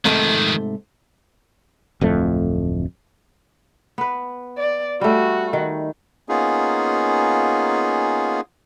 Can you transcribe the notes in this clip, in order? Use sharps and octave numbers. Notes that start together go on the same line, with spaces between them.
F2 G#2 C3 D#3 A3
D1 F2 A3
B3 B4
D5
G3 A3 F#4
D#3
A#3 B3 C#4 D#4 F4 G#4